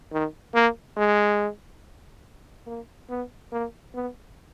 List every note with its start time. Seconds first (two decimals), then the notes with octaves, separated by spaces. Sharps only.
0.12 D#3
0.54 A#3
0.97 G#3
2.66 A#3
3.09 B3
3.52 A#3
3.94 B3